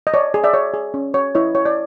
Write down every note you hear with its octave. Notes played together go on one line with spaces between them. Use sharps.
D#5
C#5 D5
G#4
D5 E5
C#5
G#4
C#4
C#5
E4 C#5 D#5
C#5
D5